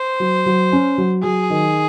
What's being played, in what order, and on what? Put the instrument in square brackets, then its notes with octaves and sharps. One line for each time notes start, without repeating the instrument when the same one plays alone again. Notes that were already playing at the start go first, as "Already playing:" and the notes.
Already playing: [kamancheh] C5
[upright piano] F#3
F#3
C#4
F#3
[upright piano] F#3 [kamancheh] G#4
[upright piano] D#3